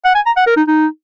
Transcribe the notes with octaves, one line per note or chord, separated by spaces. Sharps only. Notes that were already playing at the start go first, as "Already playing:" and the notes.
F#5
G#5
A#5
F#5
A#4
D#4
D#4